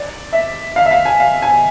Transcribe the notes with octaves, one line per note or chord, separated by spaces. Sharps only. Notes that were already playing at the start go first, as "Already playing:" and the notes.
Already playing: D5
E5
F5
E5
F5
G#5
F5
G#5